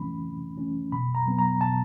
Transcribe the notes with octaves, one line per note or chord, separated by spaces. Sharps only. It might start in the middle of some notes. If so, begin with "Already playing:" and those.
Already playing: C3 E3 A3 C#4 B5
C3
E3 A3 C#4
B2 B5
A#5
F#3 B3
A#5
B2 A5